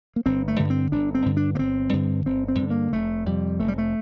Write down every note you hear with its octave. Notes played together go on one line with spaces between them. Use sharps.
A#3
G1 C4
A3
G2 D3
C4
G1 D4
C4
G2 D3
D4
A#3
G1 C4
G2 D3
G1 C4
C4
G2 D3
A#3
F1 A3
F2 C3 G3
F1 A3
G3
A3